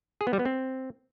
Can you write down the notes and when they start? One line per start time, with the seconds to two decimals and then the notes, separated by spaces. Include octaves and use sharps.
0.21 G#4
0.27 B3
0.33 G3
0.39 B3
0.45 C4